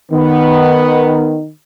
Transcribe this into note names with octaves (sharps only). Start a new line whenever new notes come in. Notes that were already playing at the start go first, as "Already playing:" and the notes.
D#3 B3